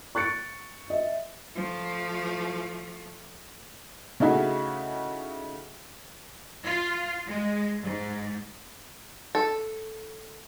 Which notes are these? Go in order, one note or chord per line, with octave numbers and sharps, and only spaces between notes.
C#6 F#6 A6 C#7 D7
D#5 E5
F3 A3
C#3 A3 D#4 E4 F#4 G#4
F4
G#3
G#2
A4